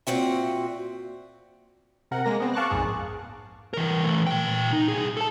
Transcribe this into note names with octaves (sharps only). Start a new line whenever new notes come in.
A#2 C4 F#4 E5
C3 A#4 F#5
G#3 A#3 A#6
B3 C4
F5 A5 C#6 D6 F#6
A#1 F2 G#2 G#4
E3 A#4
E3 A3
A#2 G5
D#4
C2 G#4
A4 A5